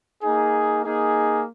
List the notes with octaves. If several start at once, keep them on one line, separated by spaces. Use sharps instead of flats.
A#3 D#4 G#4
A#3 D#4 G#4